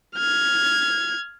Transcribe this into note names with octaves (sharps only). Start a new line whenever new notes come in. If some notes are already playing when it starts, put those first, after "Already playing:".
F6 G#6